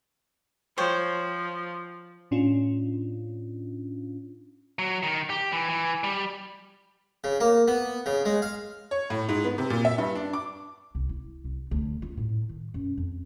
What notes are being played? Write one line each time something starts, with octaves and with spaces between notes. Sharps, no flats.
F3 C5 C#5 G5
A2 C#4 D4 F4
F#3
D#3
G4
E3
E3
G3
C#3
A#3
B3
C#3
G#3
F5
C#5
A2
G#2
B3
C3
A#2
E5
G2
D4
D6
C2
E4
C2
D2
F4
A2
D#3
F#2
F2